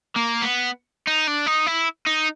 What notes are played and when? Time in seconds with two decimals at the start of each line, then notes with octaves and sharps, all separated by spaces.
0.16 A#3
0.42 B3
1.07 D#4
1.28 D4
1.47 D#4
1.67 E4
2.06 D#4